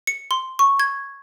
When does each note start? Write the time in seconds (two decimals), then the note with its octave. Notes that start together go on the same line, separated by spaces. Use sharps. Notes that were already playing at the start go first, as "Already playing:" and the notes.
0.07 C#7
0.31 C6
0.59 C#6
0.80 G#6